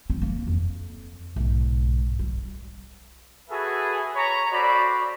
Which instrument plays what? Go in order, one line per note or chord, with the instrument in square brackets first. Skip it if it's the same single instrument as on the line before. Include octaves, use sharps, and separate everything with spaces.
[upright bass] C4
A#3
F2
B1 G#2
G3
[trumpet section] F#4 G#4 A4 B4 E5 G#5
C#5 A#5 B5 C#6
F#4 A4 C5 D5 B5